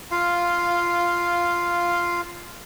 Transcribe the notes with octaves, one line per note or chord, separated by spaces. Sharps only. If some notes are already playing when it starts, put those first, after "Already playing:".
F4 F5